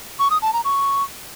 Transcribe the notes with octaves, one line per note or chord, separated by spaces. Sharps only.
C#6
D#6
A5
A#5
C#6